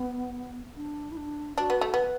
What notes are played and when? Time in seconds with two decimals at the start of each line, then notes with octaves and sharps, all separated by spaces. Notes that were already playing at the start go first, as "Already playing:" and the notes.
Already playing: B3
0.77 D4
1.12 E4
1.17 D4
1.58 D4 F#4
1.70 B3
1.81 A3
1.94 B3 B4